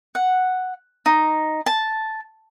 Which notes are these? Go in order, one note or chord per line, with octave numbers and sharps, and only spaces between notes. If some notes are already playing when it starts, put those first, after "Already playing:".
F#5
D#4
A5